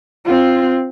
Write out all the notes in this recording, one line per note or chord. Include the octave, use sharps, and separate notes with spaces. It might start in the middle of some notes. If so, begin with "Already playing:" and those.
C4 F4